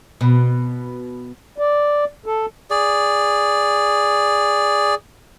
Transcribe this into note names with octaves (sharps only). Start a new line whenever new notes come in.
B2
D5
A4
G#4 D5